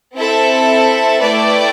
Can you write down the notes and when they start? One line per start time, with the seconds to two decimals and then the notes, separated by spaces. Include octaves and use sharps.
0.14 C4 E4 A4 E5
1.20 A3 E4 B4 D5 G5